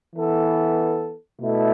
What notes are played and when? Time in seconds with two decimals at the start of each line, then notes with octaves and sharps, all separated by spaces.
0.15 E3 B3 A4
1.39 B2 A3 E4 A4